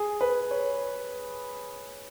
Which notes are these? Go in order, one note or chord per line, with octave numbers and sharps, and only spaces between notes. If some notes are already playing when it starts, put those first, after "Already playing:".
Already playing: G#4
B4
C#5